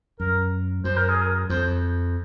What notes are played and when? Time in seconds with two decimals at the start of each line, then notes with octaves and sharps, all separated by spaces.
0.20 F#2 A#4
0.84 F#2 C5
0.97 A#4
1.09 G#4
1.21 A#4
1.49 F2 C5